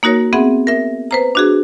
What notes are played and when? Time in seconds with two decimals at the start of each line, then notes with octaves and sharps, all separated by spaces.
0.03 A#3 D#4 F#4 A#4 C#5
0.33 B3 C4 G#4 E5 F#5
0.67 A#4 E5
1.11 B4 C5 A#5
1.35 D4 F#4 G#4